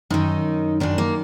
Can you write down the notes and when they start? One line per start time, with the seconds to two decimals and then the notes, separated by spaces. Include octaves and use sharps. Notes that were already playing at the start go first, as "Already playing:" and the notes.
0.10 F#2 D#3 D#4
0.80 F#2 D#3 D4
0.98 A#3